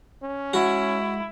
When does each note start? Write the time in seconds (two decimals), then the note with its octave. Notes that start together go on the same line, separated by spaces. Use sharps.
0.23 C#4
0.53 G#3 E4 F#4